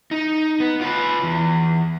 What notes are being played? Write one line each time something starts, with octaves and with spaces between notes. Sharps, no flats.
D#4
B3
F4 B4
E2